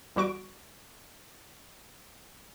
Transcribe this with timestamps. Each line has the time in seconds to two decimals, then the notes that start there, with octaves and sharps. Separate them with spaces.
0.16 E2 G3 F#4 C#6 D7